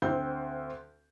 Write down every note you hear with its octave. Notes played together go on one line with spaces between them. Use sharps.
D2 C4 G6